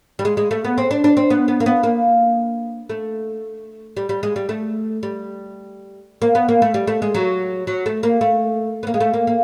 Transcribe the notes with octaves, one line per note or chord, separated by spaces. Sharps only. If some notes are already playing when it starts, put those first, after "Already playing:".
G3
G#3
G#3
A3
B3
C4
D4
D4
C4
B3
B3
A#3
B3
A#3
A3
G3
G3
G#3
G3
A3
G3
A#3
B3
A#3
A3
G3
A3
G#3
F#3
F#3
A3
A#3
A3
B3
A#3
G#3
A3
A#3
A#3